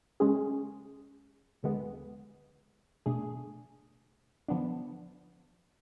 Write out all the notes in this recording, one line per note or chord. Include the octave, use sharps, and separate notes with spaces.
C#3 G#3 C#4 G#4
D2 D3 G#3 B3
B2 A3 D4 G#4
D3 F3 B3 D4